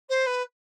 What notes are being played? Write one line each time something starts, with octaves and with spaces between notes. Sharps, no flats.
C5
B4